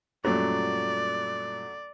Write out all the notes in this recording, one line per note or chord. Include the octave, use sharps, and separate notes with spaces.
F#2 A#2 F#3 G3 A3 D5